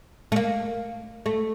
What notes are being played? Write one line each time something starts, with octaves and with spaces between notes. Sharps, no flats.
A3
A#3
A3